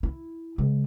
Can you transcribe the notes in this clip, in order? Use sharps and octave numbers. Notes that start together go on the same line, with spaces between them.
E4
C#3 G#3